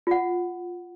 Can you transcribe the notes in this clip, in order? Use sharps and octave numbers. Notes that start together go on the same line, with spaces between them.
F4 F#5